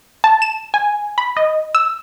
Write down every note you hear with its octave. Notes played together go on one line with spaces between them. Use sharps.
A5
E7
G#5
B5
D#5
E6